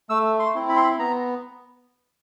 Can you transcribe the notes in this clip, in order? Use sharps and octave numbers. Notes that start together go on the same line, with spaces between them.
A3 E6
C6
C4 E4
B5
C6
B5
B3 A#5